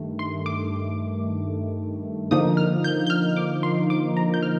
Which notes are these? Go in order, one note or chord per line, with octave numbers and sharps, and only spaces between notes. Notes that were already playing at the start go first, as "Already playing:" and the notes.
Already playing: G2 D#3 A3
C6
D6
D3 F3 A#3 D#4 D#6
F6
G6
G6
F6
D6
C6
D6
A#5
G6
F6